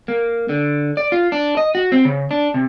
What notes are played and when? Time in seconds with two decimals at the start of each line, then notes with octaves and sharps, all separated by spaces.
0.08 A#3
0.49 D3
0.97 D5
1.12 F4
1.32 D4
1.57 D#5
1.75 F#4
1.92 C4
2.05 C#3
2.31 D4
2.54 C3